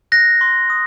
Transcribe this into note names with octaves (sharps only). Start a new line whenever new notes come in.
F#6 A#6
C6
D#6